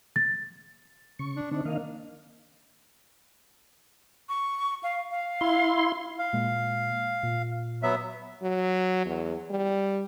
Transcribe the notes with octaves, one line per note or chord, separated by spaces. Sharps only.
A6
C#3 C#6
D4
D3 C4 D4 D#4
D#3 A#3 D#5 F5
C#6
F5
F5
E4 C6
F5
A#2 G#3 A#3
A#2
F#3 B3 E5
F#3
E2
G3